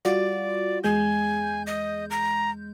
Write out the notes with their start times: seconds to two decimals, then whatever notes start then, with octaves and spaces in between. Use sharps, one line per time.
0.05 G3 F4 F#4 D5
0.84 E2 G#3 G#5 G6
1.67 D#5
2.11 A#5